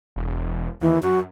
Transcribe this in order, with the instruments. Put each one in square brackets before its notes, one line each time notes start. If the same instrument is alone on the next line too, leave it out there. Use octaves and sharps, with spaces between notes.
[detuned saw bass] E1
[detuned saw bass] D#2 [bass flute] E3
[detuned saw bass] F#2 [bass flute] F#4